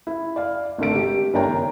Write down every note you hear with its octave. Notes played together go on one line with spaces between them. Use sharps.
E4
D5 F5
G#1 D3 A3 D7
G4
G1 D4 A#4 C#5 G5 A#5
D#3